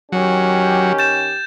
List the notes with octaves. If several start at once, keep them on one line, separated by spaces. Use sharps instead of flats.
D#3 F#3 C#4 G4
G6 A6 E7